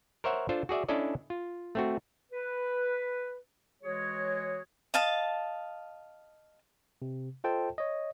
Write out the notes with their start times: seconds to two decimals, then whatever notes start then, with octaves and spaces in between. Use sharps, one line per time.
0.24 A#4 C5 C#5 E5 F#5
0.49 D4 F4 A4 C5
0.69 F#4 G#4 D5 E5
0.89 C#4 D4 E4 A4 D5 D#5
1.30 F4
1.75 A3 C4 F#4
2.32 B4
3.83 E3 G#3 F#4 G#4 C#5
4.94 D#5 F5 A5
7.02 C3
7.44 F4 A4 C5 D#5 G5 A5
7.78 C#5 D#5